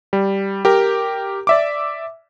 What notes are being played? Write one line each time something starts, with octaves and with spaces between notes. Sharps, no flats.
G3
G4 A#4
D5 E5 D6